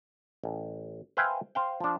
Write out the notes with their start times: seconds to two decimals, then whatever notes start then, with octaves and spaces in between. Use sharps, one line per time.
0.44 A1
1.17 B4 C5 E5 F5 G5 G#5
1.55 C5 F5 G5
1.80 F3 D4